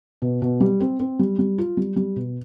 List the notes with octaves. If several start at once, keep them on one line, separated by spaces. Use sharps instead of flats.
B2
B2
G3
C4
C4
G3
G3
F4
G3
G3
B2